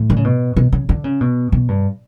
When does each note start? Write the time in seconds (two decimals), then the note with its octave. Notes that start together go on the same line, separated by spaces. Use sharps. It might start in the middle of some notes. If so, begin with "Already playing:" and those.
Already playing: A2
0.10 D3
0.16 C#3
0.24 B2
0.56 B2
0.73 C#3
0.89 D3
1.04 C#3
1.21 B2
1.52 B2
1.68 G2